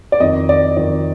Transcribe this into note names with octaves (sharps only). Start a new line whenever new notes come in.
D5
F2 D#3 D#5
D5
F2 D#3 D5